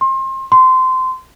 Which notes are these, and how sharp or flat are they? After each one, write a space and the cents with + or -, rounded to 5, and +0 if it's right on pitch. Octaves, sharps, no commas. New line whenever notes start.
C6 +30
C6 -20